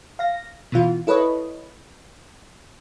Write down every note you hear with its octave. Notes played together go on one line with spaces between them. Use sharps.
F5 A#6
B2 E3 F4
E4 A4 B4 C#5 D#5